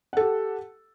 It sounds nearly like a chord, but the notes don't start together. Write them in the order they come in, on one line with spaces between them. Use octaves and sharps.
F#5 A4 G4